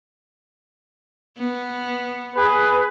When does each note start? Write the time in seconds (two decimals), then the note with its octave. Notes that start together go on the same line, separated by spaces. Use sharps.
1.38 B3
2.35 G#4 B4